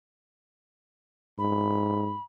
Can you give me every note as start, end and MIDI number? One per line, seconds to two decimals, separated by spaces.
1.39 2.15 44
1.39 2.23 83